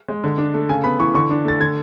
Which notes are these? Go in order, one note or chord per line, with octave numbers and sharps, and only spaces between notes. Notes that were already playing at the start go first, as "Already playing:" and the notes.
G#3
D3
D4
A3
C#3 G#5
B3 B5
E3 C#6
D3 C#6
D4
A3 A6
D3 G#6